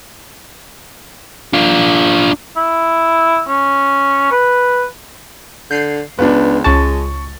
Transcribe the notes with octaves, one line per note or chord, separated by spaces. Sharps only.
D4 F4
E4
C#4
B4
D3 G6 C7
C#2 B3 D4
C#2 G#3 A5 C#6 A6